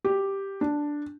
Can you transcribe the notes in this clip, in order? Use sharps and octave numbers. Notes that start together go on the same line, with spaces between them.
G4
D4